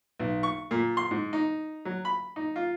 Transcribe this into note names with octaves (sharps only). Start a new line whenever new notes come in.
B1
C#6
A#2
C6
G#2
D#4
F#3
B5
D#4
F4